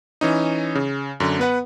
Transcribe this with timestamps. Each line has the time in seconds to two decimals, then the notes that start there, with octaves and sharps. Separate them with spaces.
0.21 E3 C#4 D#4
0.75 C#3
1.20 F#2 D3
1.39 B3 B4 F#5